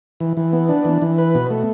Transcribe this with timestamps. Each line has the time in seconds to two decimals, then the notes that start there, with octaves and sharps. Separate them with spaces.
0.20 E3
0.37 E3
0.53 B3
0.69 D4
0.85 E3
1.02 E3
1.18 B4
1.35 B2
1.51 A3